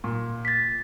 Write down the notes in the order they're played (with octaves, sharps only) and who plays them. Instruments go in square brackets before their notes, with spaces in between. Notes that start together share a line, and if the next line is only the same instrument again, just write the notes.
[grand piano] A#2
[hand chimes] A6 B6